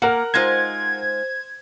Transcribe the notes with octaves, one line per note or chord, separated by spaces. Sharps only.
A#3 A#4 F#5
G#3 D#4 F4 C5 G#6